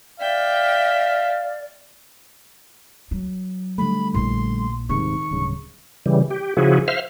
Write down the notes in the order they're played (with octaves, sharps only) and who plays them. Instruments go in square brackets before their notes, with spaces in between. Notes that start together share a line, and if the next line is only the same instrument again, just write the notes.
[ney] D5 [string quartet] E5 G5 [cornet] F5
[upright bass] F#3
[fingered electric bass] D3 G3 A3 [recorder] B5
[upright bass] A#1 E4 [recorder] C6
[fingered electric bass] D#1 G#2 C3 [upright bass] D#3 D#4 [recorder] C#6
[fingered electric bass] D1 G2 C#3
[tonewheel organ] C#3 E3 G3
G4
C#3 F3 E4 F#4 G#4
C5 E5 F5 F6